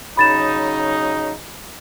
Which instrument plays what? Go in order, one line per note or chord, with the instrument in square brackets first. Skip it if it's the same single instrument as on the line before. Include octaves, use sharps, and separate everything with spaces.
[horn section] C#3 F#3 D#4 [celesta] B5 A6 E7